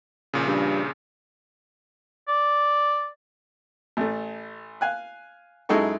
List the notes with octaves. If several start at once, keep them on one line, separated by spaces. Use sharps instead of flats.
A#1 A#2 C#3
G2
D5
A1 A3
F5 G#5 F#6
F#2 G#3 D#4 E4 A4 C#6